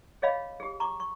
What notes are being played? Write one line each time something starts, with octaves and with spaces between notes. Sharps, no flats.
G#4 C#5 D#5 F5 B5
G4 G#4
A#5 C#6 D6
C#6